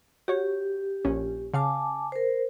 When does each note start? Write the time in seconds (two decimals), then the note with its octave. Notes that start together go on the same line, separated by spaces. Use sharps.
0.28 F#4 G4 C#5
1.05 A#1 C#4
1.54 C#3 F5 G#5 A5 D6
2.12 A#4 C5